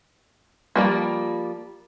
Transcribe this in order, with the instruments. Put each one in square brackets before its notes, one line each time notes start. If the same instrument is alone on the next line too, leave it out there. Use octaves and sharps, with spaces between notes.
[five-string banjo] F3 G3 A#3